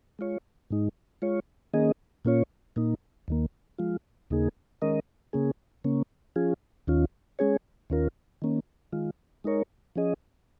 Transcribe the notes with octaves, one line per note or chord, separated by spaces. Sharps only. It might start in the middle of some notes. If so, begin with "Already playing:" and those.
G#3 F4 C#5
G#2 G#3 D#4
G#3 F4 C#5
D#3 A#3 C#4 G#4 D#5
A#2 A#3 C#4 F4 C#5
A#2 A#3 D#4
D#2 D#3 A#3
F3 G#3 F4
D#2 C#3 A#3 D#4 G#4
D#3 G#3 C#4 A#4 D#5
C#3 A#3 C#4 G#4
C#3 A#3 C#4
F3 C#4 F4 G#4
D#2 D#3 C#4 F4
G#3 C#4 G#4 C#5
D#2 D#3 C#4 F4 A#4
D#3 A#3 C#4
D#3 G#3 F4
G#3 D#4 A#4 C#5
F3 C#4 G#4 D#5